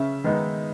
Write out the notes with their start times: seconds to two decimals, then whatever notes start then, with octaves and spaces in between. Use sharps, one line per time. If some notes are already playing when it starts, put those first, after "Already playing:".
Already playing: C#3 C#4 E5
0.24 D#3 G#3 B3 D#4